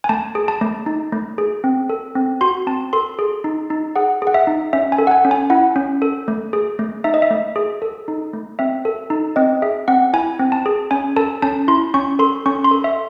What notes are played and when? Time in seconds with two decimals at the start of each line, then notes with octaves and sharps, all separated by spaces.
0.04 G#5
0.09 A3 A5
0.35 G#4
0.48 A5
0.61 A3
0.86 D#4
1.12 A3
1.38 G#4
1.64 C4
1.90 A4
2.15 C4
2.41 F#4 C6
2.67 C4 A5
2.93 A4 C6
3.19 G#4
3.44 D#4
3.70 D#4
3.96 G#4 F#5
4.22 G#4
4.27 F#5
4.34 E5
4.47 D#4
4.73 C#4 E5
4.92 G#5
4.98 A4
5.07 F#5
5.11 G#5
5.25 C#4
5.31 G#5
5.50 E4 F#5
5.76 C#4
6.02 A4
6.28 A3
6.53 G#4
6.79 A3
7.04 D#4 E5
7.14 D#5
7.22 E5
7.31 A3
7.56 G#4
7.82 A4
8.08 D#4
8.33 A3
8.59 C4 E5
8.85 A4
9.10 D#4
9.36 C4 D#5
9.62 G#4 E5
9.88 C4 F#5
10.13 E4 G#5
10.39 C4
10.52 A5
10.66 G#4
10.91 C#4 G#5
11.16 A4 A5
11.42 C#4 A5
11.68 E4 C6
11.94 C#4 C#6
12.19 A4 C6
12.46 C#4 C#6
12.64 C6
12.71 A4
12.84 E5